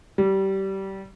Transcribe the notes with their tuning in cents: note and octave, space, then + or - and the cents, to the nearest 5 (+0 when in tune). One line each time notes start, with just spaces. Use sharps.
G3 -25